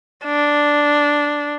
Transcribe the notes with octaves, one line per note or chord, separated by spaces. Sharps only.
D4